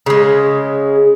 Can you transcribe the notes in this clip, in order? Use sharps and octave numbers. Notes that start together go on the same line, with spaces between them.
C#3 G#3